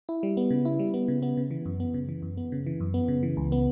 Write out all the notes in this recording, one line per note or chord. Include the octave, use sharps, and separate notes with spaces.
E4
G3
B3
C#3
E4
G3
B3
C#3
B3
C#3
E3
F#2
B3
C#3
E3
F#2
B3
C#3
E3
F#2
B3
C#3
E3
C#2
B3